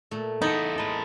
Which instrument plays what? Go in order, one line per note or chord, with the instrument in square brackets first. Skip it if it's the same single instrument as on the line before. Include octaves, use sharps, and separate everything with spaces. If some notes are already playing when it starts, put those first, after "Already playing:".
[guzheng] A#2 A3
[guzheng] E2 C5 [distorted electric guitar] B3 A4 [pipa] D#4
[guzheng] G#3 A#3 [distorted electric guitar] A4 B4